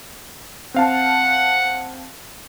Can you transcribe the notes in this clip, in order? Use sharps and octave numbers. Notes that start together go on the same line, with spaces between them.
C4 F5 F#5 A5